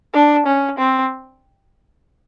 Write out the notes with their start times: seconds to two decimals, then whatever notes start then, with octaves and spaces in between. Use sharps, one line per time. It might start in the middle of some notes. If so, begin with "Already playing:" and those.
0.14 D4
0.46 C#4
0.78 C4